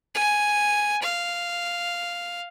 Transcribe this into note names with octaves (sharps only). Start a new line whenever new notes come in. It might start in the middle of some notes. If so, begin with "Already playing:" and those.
G#5
F5